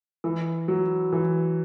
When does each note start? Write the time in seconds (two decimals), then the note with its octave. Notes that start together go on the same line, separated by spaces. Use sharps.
0.24 E3
0.68 F#3
1.12 E3